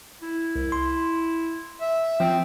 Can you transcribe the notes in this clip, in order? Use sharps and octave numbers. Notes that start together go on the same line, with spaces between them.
E4
C2
C6
E5
F3 C4